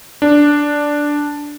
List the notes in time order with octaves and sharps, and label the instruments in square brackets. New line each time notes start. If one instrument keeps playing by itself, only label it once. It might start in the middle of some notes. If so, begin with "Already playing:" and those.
[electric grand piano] D4